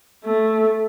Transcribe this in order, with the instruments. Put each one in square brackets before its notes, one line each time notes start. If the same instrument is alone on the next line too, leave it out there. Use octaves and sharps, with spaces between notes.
[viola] A3